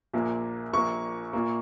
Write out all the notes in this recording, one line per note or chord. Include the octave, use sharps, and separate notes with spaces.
A#1 A#2 A#3
A#1 A#2 A#3 C#6
A#2 A#3